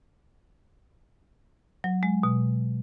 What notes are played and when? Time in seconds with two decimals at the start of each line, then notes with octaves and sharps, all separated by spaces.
1.84 F#3
2.03 G#3
2.23 B2